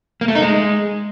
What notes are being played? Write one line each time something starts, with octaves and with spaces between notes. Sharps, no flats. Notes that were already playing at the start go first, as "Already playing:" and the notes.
A#3
A3
D#4
G#3